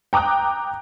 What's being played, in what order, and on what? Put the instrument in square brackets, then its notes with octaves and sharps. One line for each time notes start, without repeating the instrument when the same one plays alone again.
[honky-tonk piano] G5 A#5 D6 D#6 F#6